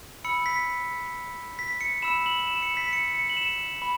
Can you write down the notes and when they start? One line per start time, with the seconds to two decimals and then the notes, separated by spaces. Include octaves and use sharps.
0.24 B5 E6 C#7
0.46 B6
1.59 B6
1.81 C#7
2.02 B5 E6 E7
2.26 F#7
2.47 E7
2.62 C#7
2.77 B6
2.93 C#7
3.14 C#7
3.30 F#7
3.37 E7
3.82 B5